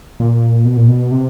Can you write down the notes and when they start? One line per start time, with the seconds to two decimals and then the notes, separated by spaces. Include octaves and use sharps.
0.20 A#2
0.65 B2
0.77 A#2
0.88 B2
1.12 C3